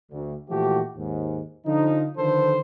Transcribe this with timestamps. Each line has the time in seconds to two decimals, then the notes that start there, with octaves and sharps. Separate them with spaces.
0.11 D2
0.49 A#2 E3 F3 A3 F#4 G4
0.96 D#2 G#2
1.66 D3 F3 D#4
2.18 D3 D#3 F3 A4 B4 C5